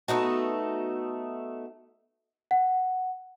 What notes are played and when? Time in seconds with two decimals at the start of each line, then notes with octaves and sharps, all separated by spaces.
0.08 A3 B3 D#4 F#4
2.51 F#5